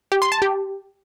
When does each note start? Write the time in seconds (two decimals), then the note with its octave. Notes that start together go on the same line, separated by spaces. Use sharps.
0.12 G4
0.22 C6
0.32 A5
0.42 G4